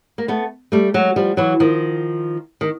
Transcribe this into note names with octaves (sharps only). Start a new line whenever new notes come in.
A#3
A3 B3
G3 A3
F#3 G#3
F3 G3
E3 F#3
D#3 F3
D#3